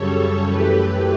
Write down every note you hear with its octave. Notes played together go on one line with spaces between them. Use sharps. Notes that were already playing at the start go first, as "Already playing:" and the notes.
Already playing: F#2 C#3 G3 A4 C#5
F#2 E3 A3 G4 B4